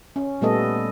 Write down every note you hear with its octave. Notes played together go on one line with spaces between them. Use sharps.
C#4
A#2 G3 A3 B3 A4 D#5